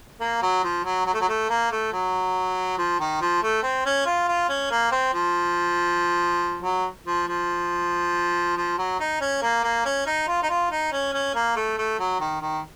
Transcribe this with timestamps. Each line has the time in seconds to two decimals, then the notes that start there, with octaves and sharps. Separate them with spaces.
0.20 A#3
0.42 F#3
0.64 F3
0.84 F#3
1.06 F#3
1.13 A3
1.21 F#3
1.28 A3
1.49 A#3
1.71 A3
1.92 F#3
2.78 F3
3.00 D#3
3.21 F3
3.43 A3
3.63 C4
3.85 C#4
4.06 F4
4.28 F4
4.49 C#4
4.71 A#3
4.92 C4
5.14 F3
6.63 F#3
7.06 F3
7.27 F3
8.57 F3
8.78 F#3
8.99 D#4
9.21 C#4
9.42 A#3
9.63 A#3
9.85 C#4
10.06 D#4
10.28 F4
10.42 D#4
10.49 F4
10.70 D#4
10.92 C#4
11.13 C#4
11.35 A#3
11.56 A3
11.78 A3
11.99 F#3
12.20 D#3
12.41 D#3